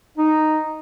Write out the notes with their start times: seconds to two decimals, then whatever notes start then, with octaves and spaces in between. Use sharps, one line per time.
0.17 D#4